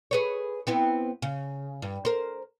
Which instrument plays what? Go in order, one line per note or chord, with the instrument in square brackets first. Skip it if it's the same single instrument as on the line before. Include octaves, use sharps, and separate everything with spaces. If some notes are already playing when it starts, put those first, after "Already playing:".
[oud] G#4 B4 C#5
B3 C4 E4
C#3
G2
A#4 C5